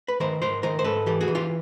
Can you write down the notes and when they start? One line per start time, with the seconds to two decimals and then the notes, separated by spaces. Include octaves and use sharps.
0.08 B4
0.20 D#3 A#4 C5
0.42 G#2 A#4 C5
0.63 D#3 A#4 C5
0.79 C5
0.84 G#2 A4 B4
1.06 E3 G4 A4
1.21 F#4 G#4
1.28 E3
1.35 F4 G4